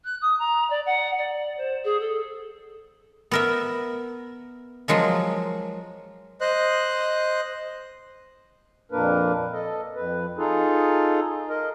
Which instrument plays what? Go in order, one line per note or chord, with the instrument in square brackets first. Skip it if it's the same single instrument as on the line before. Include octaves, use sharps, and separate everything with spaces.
[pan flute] F#6
D#6
A#5
D5
F#5
D5
C5
G#4
A4
[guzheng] B3 A#4 E5
F3 F#3 G#3 A#3
[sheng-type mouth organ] C5 D#5 F#6
[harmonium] F2 A#2 A#3 D4 A#4 B4
A4 D#5
F2 B4
D#4 F4 G#4 A4
A#4 D#5